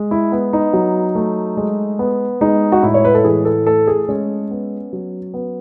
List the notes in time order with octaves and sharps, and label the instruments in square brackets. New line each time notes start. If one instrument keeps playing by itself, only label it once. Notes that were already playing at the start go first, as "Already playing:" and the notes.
Already playing: [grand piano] G#3
E4
B3
D#4
F#3
A3
G#3
B3
G#3 D#4
F#4
A2 E4
C#5
B4
A4
E3 G#4
A4
A3 A4
G#4
G#3 C#4
B3
F#3
B3